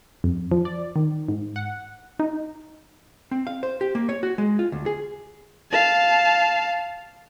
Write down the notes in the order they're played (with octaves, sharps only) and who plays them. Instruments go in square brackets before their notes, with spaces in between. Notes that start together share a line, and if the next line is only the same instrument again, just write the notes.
[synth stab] F2
F3
D5
D#3
G#2
F#5
D#4
[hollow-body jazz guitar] C4
F5
C5
G4
A#3
C#5
F#4
G#3
F4
D2
G#4
[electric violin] F5 A5